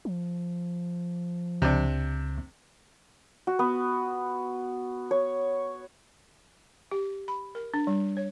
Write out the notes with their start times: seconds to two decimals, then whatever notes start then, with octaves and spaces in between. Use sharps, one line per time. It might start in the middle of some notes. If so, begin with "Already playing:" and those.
0.05 F3
1.62 C#2 C3 D4
3.47 F#4
3.59 B3
5.11 C#5
6.91 G4
7.28 B5
7.55 A#4
7.74 D4
7.87 G3
8.17 C#5